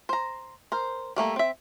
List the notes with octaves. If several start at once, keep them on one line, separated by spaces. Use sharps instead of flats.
C5 A#5
A#4 C5
G3 A3 A#3 A4
C4 E5